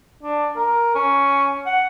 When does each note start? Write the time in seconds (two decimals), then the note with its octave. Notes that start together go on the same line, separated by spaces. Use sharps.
0.23 D4
0.56 A#4
0.95 C#4
1.66 F#5